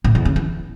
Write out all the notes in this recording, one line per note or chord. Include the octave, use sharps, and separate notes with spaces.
A2
E2
C#3
E3